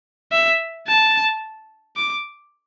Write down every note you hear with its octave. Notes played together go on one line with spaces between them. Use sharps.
E5
A5
D6